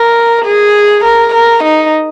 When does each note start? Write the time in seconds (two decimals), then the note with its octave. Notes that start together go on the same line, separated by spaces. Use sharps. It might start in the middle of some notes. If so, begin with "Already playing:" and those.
Already playing: A#4
0.45 G#4
1.04 A#4
1.34 A#4
1.64 D#4